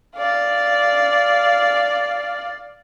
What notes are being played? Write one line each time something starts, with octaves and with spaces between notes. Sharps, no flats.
D5 F5